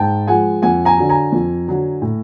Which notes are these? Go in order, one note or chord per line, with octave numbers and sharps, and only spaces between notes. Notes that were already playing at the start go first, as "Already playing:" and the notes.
Already playing: G#2 G5 A5
F3 G#3 F#5 G#5
F2 F#5 G#5
G#5 A#5
D3 F#3
G#5 A#5
F2
D3 F#3
A2